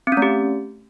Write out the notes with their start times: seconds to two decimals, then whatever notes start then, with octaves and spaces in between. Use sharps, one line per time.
0.07 C4
0.12 C#4
0.17 A3
0.22 G4